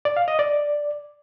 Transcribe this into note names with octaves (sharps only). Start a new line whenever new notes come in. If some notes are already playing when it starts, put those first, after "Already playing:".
D5
F5
D#5
D5